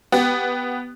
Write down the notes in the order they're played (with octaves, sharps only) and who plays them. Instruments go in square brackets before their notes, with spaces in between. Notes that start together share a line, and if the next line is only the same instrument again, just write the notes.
[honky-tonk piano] B3 G4